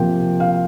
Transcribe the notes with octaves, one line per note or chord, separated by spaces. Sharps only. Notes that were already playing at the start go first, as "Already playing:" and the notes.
Already playing: C3 F3 A#3 G5
F5